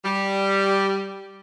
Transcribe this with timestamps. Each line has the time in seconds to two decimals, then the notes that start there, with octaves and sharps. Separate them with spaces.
0.03 G3